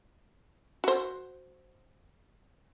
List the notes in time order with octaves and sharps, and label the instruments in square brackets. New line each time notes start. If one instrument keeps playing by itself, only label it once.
[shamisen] F#4 C5